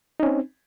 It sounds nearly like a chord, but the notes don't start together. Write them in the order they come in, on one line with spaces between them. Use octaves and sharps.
D#4 C#4 C4